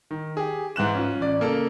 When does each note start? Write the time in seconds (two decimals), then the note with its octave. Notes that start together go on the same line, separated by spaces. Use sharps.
0.11 D#3
0.37 G4 G#4
0.76 G#2 E3 F#6 E7
0.94 C#4 F4
1.20 A1 D5
1.40 C#3 A#3 A4 A#4